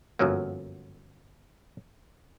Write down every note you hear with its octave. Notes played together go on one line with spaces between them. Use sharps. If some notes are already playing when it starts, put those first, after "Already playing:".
G1 F#2 F3 F#3 A#3